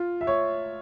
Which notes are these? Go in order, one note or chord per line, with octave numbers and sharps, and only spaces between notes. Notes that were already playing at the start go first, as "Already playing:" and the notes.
Already playing: F4
E5
C#5